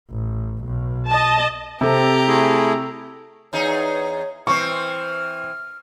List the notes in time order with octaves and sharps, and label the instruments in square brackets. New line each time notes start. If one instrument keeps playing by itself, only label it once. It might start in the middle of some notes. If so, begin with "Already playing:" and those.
[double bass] A1
B1 B2
[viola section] D#5 A5
[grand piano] C3 [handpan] C4 A4 [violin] G4 A#5
[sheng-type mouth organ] A3 E4 G#4
[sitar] E2 D#4 G#4 [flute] C#5
[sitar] E3 C4 [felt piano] C#6 [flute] F6